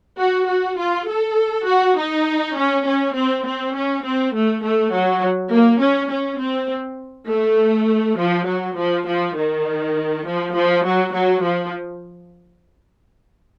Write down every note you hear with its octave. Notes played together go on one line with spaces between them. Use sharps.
F#4
F#4
F4
A4
F#4
D#4
C#4
C#4
C4
C4
C#4
C4
A3
A3
F#3
A#3
C#4
C#4
C4
A3
F3
F#3
F3
F3
D#3
F3
F3
F#3
F#3
F3